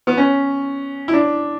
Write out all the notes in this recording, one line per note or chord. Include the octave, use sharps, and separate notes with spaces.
B3
C#4
E4
D4